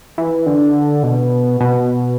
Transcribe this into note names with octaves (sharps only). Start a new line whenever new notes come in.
E3
D3
B2
B2